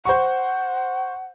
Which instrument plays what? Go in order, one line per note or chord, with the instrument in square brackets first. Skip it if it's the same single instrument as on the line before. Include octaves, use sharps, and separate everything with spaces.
[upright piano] C5 C#6 [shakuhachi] F#5